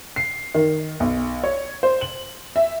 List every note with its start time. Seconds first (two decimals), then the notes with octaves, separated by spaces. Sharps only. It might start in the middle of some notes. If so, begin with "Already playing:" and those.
0.16 C7
0.54 D#3
1.00 B1
1.44 C#5
1.83 C5
2.01 F#7
2.56 E5